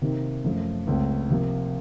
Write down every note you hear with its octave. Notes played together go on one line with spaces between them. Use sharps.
C3 D#3 A#3
F#2 F3 A3
C#2 C#3 A3 C4
C3 F3 A#3